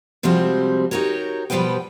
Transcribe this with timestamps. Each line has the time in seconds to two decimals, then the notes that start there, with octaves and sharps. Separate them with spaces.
0.23 C3 F3 G3 G#3 C4 F#4
0.91 D#4 F#4 G4 A#4 C#5
1.50 B2 F3 G3 B3 B4 G5